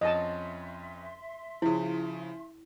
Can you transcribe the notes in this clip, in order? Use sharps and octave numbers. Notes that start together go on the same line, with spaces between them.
F2 C#4 D#5 E5 A5 C6
C#3 F3 E4